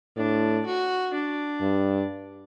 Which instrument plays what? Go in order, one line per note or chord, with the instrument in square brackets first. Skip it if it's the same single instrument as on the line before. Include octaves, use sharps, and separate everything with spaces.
[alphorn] A2 [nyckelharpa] D4
[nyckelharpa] F#4
D4
[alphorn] G2